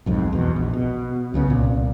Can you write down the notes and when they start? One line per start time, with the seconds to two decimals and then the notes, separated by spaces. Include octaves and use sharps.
0.06 B1 F2 G#2
0.33 E2 B2
0.56 A#1
0.73 B2
1.34 C#2 C#3 A3 B3
1.47 C2 A#2